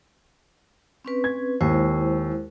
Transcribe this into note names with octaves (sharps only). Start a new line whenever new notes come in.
C4 C#4 B4
G#6
D#2 G#3 E4 C5